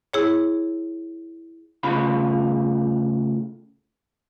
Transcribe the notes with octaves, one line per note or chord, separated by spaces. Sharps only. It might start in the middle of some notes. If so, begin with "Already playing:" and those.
E4 G#4 C#5
A2 C#3 F4 B5